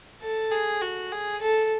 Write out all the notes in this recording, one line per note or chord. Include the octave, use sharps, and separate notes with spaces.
A4
G#4
F#4
G#4
A4